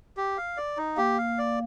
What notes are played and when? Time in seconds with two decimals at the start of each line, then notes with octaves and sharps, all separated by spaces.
0.17 G4
0.37 F5
0.57 D5
0.77 D#4
0.97 A#3 G4
1.18 F5
1.38 D5